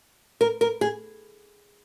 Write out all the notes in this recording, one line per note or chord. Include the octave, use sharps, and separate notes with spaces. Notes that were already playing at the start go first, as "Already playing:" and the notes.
A#4
A#4
G#4